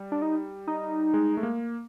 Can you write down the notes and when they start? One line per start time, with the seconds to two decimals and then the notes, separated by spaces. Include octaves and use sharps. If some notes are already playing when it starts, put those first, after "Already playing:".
Already playing: G3
0.12 D4
0.22 D#4
0.67 D#4
1.14 G#3
1.37 A3
1.43 A#3